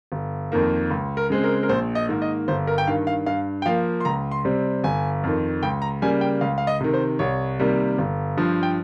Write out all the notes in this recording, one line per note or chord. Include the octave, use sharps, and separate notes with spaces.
G1
F2 D#3 A#3
C#2
A#4
C#3 G#3 C4
A#4
A#4
A#1 C5
D#5
G#2 D#3 A#3
D#5
G1 C5
A#4
G5
G2 D#3 F5
F5
G2 F5
G5
F3 A#3 F5
C6
C#2 A#5
C6
C3 G3 C4
G1 G#5
F2 D#3
C#2 G5
A#5
C#3 G3 A#3 G#5
G5
C#2 F5
F5
D#5
C3 D#3
C5
C2 C#5
C3 D#3 G3 A#3
G1
G2 F3
G5